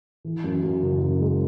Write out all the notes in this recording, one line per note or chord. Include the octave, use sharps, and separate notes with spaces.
E3
F#2
F#2
F#1
F#2
G#3